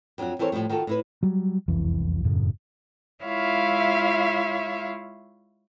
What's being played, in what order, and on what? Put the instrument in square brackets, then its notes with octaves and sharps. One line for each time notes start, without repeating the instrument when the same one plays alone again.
[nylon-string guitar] F2 F#3 D4 F4 F#5
E3 C4 A4 A#4 C5 C#5
A2 F3 G3 A3
D#3 F4 F#4 A4
A2 E4 B4
[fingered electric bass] F#3 G3
E1 C2 F2 E3
E1 F#2 A2 C#3
[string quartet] G#3 E4 F4 C#5 E5 F5